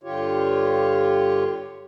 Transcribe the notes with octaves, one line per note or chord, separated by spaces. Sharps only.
G2 D3 F4 G4 C#5